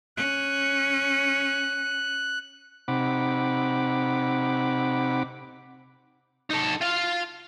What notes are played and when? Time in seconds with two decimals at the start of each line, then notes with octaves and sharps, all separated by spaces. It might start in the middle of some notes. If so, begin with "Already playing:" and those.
0.17 C#4 F#6
2.88 C3 C4 D#4 F#5 B5 D6
6.51 D#4 A4
6.82 F4 F5